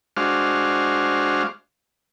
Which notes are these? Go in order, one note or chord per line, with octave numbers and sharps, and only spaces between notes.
G#3 D4 F#4 C5 F5